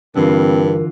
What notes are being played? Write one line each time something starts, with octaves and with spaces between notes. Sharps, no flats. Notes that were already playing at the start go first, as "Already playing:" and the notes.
G2 D3 E3 C4 F4 A#4